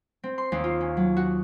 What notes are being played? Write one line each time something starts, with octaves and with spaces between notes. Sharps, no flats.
C4
C6
D#2
F4
C#4
F#3
F#4